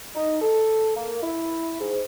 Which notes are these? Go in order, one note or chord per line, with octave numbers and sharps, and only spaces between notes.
D#4
A4
A#3
E4
G#2